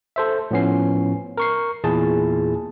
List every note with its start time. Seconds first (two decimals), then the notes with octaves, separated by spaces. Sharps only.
0.16 A4 C5 E5
0.51 A2 F3 B3 C#4 C7
1.37 A#4 C#6 C7
1.84 E2 A#2 E4 G#4 A5